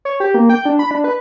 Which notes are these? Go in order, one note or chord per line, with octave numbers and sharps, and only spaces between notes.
C#5
G4
A#3
G5
D4
B5
D4
B4